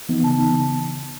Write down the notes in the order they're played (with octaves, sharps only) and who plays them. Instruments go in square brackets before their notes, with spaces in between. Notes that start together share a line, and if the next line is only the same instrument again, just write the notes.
[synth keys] E3 B3 D#4
C#3 A5
E3 B3 D#4
C#3